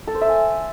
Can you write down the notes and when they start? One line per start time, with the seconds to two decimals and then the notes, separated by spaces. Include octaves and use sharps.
0.07 A4
0.14 C5
0.21 E5
0.28 G#5